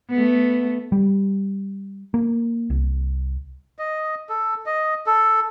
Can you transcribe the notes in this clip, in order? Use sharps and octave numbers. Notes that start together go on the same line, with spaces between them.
A3 B3
G3
A#3
C2
D#5
A4
D#5
A4